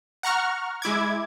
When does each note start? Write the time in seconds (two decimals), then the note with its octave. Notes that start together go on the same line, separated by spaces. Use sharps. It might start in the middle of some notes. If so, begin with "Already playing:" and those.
0.23 F#5 A#5 C#6 F6
0.82 G#3 E4 D6 G#6